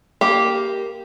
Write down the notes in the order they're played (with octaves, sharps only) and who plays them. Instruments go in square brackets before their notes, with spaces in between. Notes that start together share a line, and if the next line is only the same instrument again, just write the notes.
[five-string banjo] A#3 G4